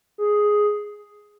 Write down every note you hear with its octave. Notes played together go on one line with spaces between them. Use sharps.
G#4